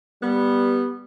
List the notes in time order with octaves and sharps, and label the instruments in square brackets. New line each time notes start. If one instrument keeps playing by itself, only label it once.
[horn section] G3 B3